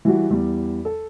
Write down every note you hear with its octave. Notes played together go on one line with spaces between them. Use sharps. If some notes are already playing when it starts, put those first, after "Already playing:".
E3 G3 F#4
E2 G3
A4